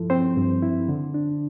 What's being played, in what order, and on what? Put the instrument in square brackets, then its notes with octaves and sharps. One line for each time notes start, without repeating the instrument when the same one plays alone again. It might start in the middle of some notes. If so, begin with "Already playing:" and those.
Already playing: [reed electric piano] G2 F3 E4 A4
C4 C5
G2
E4
D3
D4